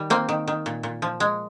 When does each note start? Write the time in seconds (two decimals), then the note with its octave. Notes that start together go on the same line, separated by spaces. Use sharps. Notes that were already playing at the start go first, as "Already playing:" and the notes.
Already playing: D#3 G3
0.10 A#3 C4
0.29 D#3
0.48 D#3
0.66 A#2
0.83 A#2
1.02 F3
1.20 G#3